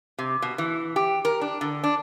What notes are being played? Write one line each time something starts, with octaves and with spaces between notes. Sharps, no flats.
C3
B2
E3
G4
A#4
D4
D3
D4